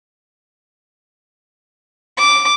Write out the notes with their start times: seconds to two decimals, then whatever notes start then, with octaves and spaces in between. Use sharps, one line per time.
2.18 D6